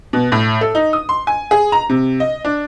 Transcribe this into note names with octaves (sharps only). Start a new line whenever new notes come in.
B2
A2
A4
D#4
D#6
C6
G#5
G#4
A#5
C3
D#5
D4